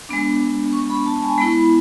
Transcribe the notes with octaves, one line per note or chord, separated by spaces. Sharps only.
G#3 B3 D4
C#6
B5
A5
G#5
G#3 B3 E4 B5